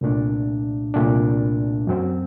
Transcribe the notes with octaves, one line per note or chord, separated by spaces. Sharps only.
C2 A#2 A3 D4
C2 A#2 A3 D4
F#2 F#3 C4